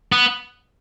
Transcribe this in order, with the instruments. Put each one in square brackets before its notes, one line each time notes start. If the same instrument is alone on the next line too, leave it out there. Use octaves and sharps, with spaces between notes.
[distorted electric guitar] B3